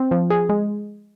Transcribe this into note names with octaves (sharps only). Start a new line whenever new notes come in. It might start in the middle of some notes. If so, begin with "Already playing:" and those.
Already playing: C4
F3
G#4
G#3